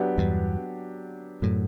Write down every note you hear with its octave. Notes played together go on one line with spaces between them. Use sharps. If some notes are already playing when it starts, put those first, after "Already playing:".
Already playing: F#3 B3 D4 G4
E2 G2
F#2 A2